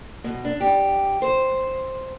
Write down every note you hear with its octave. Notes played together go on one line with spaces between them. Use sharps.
B2
D4
G4
C5